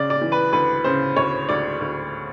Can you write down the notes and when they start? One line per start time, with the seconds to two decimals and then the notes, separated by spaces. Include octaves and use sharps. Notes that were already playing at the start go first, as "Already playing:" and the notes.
Already playing: C#3 D5
0.10 D5
0.21 E3
0.32 B4
0.53 D2 B4
0.84 C#3 C5
1.16 D2 C#5
1.49 D2 D5
1.81 D2